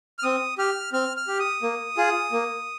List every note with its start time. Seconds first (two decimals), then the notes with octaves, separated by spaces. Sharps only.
0.19 F6
0.23 C4 D#6
0.58 G4 F6
0.93 C4 F6
1.17 F6
1.27 G4
1.40 D#6
1.62 A#3
1.97 F4 G#4
2.32 A#3